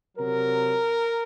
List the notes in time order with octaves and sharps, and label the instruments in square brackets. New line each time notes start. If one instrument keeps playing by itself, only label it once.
[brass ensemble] C3 F#3 A#4